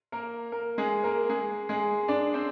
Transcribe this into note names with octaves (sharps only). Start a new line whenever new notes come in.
A#3 A#4
A#3 A#4
G#3 G#4
A#3 A#4
G#3 G#4
G#3 G#4
D4 D5
C4 C5